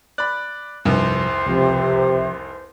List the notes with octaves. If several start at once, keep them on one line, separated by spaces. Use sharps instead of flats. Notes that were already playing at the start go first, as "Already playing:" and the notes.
D5 B5 F#6
F1 C2 G2 C3 F3 C5
C#2 C3 F3